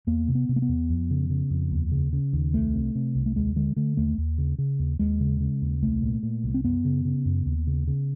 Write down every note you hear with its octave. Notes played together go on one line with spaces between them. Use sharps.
E2 A#3
C3
B3
C3
A#3
B3
E2
F2
C#3
C#3
F2
D#2
C#3
C#3
D#2
C2 A3
C3
C3
C2
A3
D#2 G#3
D3 G#3
D3 A3
D#2 A3
D#2
C#3
C#3
D#2
D#2 G#3
C#3
C#3
D#2
C2 A3
A#2
A#2
C2
C4
F#2 B3
C#3
C#3
F#2
D#2
C#3
C#3